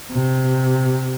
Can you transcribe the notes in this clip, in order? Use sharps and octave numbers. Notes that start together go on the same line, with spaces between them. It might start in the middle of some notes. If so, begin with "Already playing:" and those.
C3